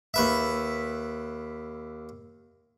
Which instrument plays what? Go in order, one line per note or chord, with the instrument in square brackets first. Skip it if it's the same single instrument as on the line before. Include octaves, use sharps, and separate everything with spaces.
[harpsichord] D#2 B4 E5